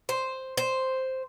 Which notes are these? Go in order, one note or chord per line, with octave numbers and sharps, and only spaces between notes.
C5
C5